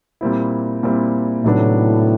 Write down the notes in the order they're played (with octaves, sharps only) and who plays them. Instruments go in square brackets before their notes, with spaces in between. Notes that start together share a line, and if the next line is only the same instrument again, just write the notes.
[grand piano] A#2 G3 C4 E4
A#2 G3 C4 E4
[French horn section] A2 [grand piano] C3 D#3 F#3 B3 D4